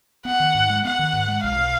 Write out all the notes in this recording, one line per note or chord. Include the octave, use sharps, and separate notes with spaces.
B3 F#5
D#3
G#2
G#3
B3 F#5
D#3
G#2
G#3
B1 F5
B2